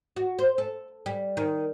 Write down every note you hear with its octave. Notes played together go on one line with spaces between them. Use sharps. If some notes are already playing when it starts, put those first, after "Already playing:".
F#4
C5
A4
G3
D#3